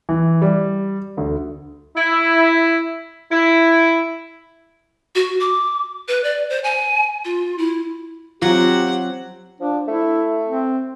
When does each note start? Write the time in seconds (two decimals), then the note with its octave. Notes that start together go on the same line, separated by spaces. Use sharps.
0.09 E3
0.42 G3
1.17 D2
1.96 E4
3.31 E4
5.15 F#4
5.40 D6
6.08 B4
6.24 D5
6.50 C5
6.64 G#5
7.25 F4
7.58 E4
8.42 F#3 C4 F4 G4 F#5
9.61 F3 D4
9.88 A3 E4
10.46 C4